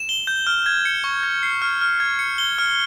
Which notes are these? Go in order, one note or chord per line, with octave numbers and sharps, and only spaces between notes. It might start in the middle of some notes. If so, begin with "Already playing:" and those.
Already playing: E7
G7
G6
F6
G#6
C#7
C#6
G#6
C7
F6
F6
G#6
C#7
G7
F6